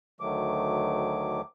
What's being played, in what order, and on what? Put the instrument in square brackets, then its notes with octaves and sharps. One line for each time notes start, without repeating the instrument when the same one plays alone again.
[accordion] D2 D#3 F#3 A3 D6